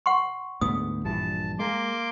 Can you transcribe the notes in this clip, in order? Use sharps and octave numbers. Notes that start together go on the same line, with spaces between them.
F#5 C6 C#6
D2 G#2 B3 D#6
A#1 G2 E3 A5
G#3 A#3 C6 D6